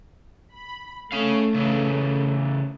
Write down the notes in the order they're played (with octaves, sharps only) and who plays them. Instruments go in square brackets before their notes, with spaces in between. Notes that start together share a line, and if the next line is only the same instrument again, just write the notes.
[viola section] B5
[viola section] A3 [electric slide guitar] C#4 F5
[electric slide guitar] C#3 E3